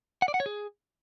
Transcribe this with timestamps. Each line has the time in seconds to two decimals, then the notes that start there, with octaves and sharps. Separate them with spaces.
0.22 F#5
0.28 D5
0.34 F#5
0.40 C#5
0.46 G#4